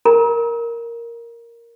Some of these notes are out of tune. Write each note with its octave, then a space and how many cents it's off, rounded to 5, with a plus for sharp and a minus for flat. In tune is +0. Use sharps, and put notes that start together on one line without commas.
A#4 +0 A#5 +35